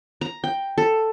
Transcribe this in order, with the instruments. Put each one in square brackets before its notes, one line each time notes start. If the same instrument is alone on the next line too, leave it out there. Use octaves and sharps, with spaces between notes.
[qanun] A#5
G5
A4